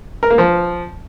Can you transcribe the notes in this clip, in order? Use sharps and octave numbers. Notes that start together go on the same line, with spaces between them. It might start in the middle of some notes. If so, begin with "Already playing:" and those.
A#4
A#3
F3